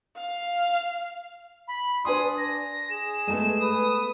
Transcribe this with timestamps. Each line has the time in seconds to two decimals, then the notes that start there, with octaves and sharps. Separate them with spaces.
0.16 F5
1.68 B5
2.05 D4 B4 G#5 C6 D#6
2.38 A#6
2.91 G#4 E7
3.27 G#3 A3 B3 E7
3.60 B4 D#6